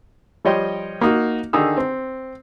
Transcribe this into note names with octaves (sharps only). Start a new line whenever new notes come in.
F3 G3 C#5 D#5 G5 C6
A#3 D#4 F#4
D3 D#3 D#4 G#4 E6
C4